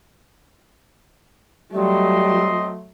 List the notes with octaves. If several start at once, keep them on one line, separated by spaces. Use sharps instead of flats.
F#3 G3 A3 C4 D#5 C6